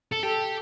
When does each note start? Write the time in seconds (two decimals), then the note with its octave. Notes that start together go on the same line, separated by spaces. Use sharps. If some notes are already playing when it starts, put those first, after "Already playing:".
0.12 A4
0.23 G4 A4